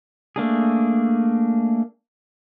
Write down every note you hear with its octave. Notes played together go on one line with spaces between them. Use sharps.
A3 A#3 D4 G#4